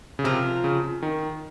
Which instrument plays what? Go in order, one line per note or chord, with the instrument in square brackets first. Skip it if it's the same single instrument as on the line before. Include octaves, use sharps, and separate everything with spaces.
[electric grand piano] C#3
[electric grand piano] C3 [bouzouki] F3 C4 F4 A#4
[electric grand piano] C#3
D#3